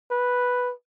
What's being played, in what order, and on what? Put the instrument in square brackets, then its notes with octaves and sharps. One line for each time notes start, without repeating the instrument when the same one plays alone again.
[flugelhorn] B4